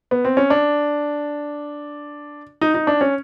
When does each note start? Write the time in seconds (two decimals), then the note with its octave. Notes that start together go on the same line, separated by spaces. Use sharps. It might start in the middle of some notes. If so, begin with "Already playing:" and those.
0.11 B3
0.25 C4
0.37 C#4
0.50 D4
2.61 D#4
2.74 D#4
2.87 D4
3.01 C#4